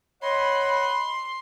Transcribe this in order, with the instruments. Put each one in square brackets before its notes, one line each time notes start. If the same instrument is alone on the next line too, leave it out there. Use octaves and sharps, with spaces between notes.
[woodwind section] C#5 D#5 F#5 [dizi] B5 [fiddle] C6